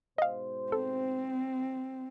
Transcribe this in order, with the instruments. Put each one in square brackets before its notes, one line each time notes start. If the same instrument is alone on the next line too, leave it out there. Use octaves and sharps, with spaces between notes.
[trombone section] G#2 B2 C5 [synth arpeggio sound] D#5 F5
[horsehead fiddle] C4 [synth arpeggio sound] A4